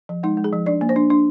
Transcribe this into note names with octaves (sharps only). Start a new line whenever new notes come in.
F3
G#3 D#4
G#3
G#4
F3
D4 D5
A#3
C5
D4
D4